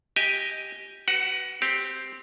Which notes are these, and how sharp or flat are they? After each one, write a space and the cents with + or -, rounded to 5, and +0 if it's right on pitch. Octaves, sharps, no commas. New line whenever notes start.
G4 +0 D#5 +10 G#5 -5
F#4 +35 B4 +0 F#5 +0
C4 +0 G4 +0